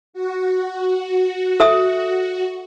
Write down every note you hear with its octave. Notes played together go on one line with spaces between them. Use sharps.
F#4
A4 E5 D#6